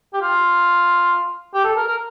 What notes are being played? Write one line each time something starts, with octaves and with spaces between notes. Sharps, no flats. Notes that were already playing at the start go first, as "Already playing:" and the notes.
G4
F4
G4
A4
A#4
A#4